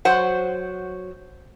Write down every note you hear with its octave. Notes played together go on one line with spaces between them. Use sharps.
F#3 C5 F#5